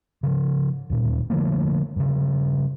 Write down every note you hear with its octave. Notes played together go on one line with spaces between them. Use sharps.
C#3 E3 F3
D1 D#2 A#2
D3 F3 A3 A#3
G2 C#3